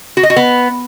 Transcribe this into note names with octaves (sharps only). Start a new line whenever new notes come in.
F#4
D#5
F#4
B3